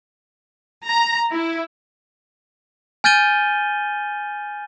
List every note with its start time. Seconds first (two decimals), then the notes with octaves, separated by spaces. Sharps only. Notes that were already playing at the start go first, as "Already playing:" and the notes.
0.85 A#5
1.30 E4
3.04 G#5 F6 G6 A6 D#7 G7